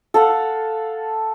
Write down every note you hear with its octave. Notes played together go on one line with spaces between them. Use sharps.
A4 F5 F#5